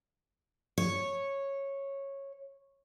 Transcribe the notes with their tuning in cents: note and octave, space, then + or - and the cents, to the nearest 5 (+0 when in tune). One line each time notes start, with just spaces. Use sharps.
C#5 -10